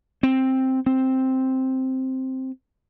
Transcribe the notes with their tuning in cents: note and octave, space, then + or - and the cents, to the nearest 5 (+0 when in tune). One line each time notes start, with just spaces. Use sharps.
C4 +5
C4 +0